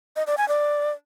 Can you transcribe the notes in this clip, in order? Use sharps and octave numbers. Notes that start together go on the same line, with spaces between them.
D#5
D5
G#5
D5